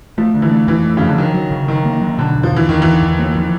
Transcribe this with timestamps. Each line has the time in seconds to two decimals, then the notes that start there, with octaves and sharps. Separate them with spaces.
0.18 F3 A3
0.34 D3
0.42 E3
0.51 A3
0.68 F2 E3
0.85 A3
0.97 C#3 F3
1.07 D3
1.18 D#3 F#3
1.34 F#3
1.51 C#3
1.68 D#3 F#3
1.85 A#3
2.02 F#3
2.18 B2 D3
2.35 E2
2.43 F3
2.52 E2 E3
2.69 E2 D#3
2.82 E2 E3
3.02 E2
3.19 A#3
3.36 F3